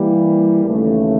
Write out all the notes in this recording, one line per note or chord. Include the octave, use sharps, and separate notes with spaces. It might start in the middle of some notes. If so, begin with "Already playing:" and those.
Already playing: E3 G3 A#3
D#2 C#3 E3 A3 C#4